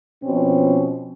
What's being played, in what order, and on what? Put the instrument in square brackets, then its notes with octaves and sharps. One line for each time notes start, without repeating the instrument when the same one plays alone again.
[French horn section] B2 F3 C4 C#4